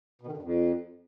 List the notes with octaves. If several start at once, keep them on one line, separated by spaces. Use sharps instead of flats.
B2
D#3
D3
G2
F2